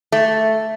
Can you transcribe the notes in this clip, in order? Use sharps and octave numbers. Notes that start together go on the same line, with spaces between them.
A3